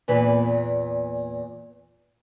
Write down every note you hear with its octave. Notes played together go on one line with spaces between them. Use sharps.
E2 A#2 B4